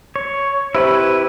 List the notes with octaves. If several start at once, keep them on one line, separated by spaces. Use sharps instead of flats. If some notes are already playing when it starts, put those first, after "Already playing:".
C#5
C3 E4 B4 B5